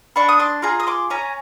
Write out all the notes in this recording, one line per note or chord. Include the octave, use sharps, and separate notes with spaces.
D4 B5 C#6
D#6
C6 D6
F4 G#4 A#5 C6
D#6
C6 D6
C#4 G#5 A#5